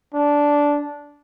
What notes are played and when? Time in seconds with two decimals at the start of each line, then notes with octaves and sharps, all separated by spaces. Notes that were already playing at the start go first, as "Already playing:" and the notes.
0.14 D4